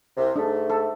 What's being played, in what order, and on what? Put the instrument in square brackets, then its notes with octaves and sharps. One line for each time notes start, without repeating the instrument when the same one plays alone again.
[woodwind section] C2 C3
[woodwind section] G#2 A3 [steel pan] D4
[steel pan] A4